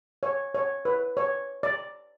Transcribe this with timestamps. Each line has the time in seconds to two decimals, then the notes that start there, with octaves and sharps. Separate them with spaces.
0.23 C#5
0.55 C#5
0.85 B4
1.17 C#5
1.63 D5